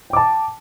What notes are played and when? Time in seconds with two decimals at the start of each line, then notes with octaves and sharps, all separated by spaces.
0.10 G5
0.13 D6
0.17 A5